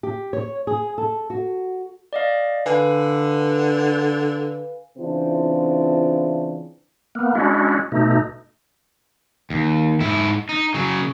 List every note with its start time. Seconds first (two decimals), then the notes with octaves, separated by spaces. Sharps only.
0.03 G4
0.33 C#5
0.67 G#4
0.98 A4
1.30 F#4
2.13 D5 D#5 F5
2.66 D3 B4 F5 G#5
4.98 C#3 E3 C4 D4 E4 F4
7.15 A#3 B3
7.35 G#3 C#4 D4 E4 F#4
7.92 B2 A3 D#4
9.50 D#2
10.00 G#2 E4
10.49 D#4
10.74 C#3 F#3